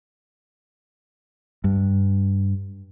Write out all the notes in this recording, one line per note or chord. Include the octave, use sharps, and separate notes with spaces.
G2